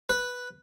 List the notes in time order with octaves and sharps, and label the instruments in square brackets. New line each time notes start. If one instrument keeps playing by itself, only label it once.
[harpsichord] B4